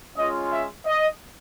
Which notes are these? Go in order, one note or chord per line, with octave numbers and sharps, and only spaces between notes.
G#3 C#4 F4 D#5
E5
D#5